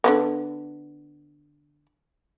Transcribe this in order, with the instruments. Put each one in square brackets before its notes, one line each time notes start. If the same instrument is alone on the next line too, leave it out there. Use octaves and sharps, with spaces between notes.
[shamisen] D3 A#3 B3